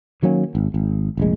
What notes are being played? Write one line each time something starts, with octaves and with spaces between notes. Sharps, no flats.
D#3 F#3 A#3 C#4
G#1
G#1
F1 A#1 G#3